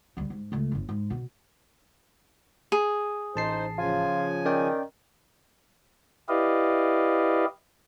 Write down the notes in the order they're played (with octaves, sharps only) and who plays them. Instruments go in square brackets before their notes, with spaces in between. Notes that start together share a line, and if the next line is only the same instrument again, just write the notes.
[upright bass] D2 G3
G#2
C#2 A3
G1 E2
G#2
B2 B3
[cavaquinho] G#4
[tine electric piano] A1 A5 C7 [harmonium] D#4 C5
[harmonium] C#3 F3 G#5 [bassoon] F4
[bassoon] D#3 [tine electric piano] C#4 D5 G5
[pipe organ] E4 G4 B4 D5 D#5 F5